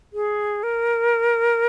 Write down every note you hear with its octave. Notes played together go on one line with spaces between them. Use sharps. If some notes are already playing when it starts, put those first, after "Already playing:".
G#4
A#4